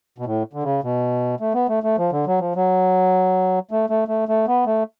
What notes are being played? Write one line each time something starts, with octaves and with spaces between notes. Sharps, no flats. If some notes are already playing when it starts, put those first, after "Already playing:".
B2
A2
D3
C#3
B2
A3
B3
A3
A3
F3
D3
F#3
F3
F#3
A3
A3
A3
A3
B3
A3